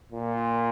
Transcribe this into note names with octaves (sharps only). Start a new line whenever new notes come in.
A#2